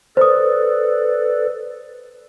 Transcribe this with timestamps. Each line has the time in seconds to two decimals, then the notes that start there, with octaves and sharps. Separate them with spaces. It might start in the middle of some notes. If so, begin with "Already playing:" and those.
0.17 A4 B4 C5 D5 D#6